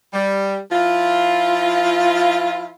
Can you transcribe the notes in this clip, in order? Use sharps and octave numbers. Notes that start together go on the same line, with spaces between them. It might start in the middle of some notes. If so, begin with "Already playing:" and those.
G3
F3 E4 F4